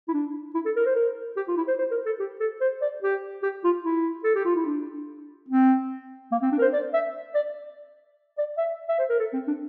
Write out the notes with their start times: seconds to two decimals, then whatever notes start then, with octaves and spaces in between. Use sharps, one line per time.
0.08 E4
0.14 D4
0.55 E4
0.65 A4
0.76 A#4
0.86 C5
0.96 A#4
1.37 G4
1.48 F4
1.57 E4
1.68 C5
1.79 C5
1.92 A#4
2.06 A4
2.20 G4
2.40 A4
2.61 C5
2.81 D5
3.03 G4
3.43 G4
3.64 F4
3.84 E4
4.24 A4
4.35 G4
4.45 F4
4.56 E4
4.66 D4
5.49 C4
6.32 A#3
6.42 C4
6.52 D4
6.59 A#4
6.62 C5
6.73 D5
6.93 E5
7.34 D5
8.38 D5
8.58 E5
8.89 E5
8.98 C5
9.09 A#4
9.19 A4
9.33 C4
9.48 D4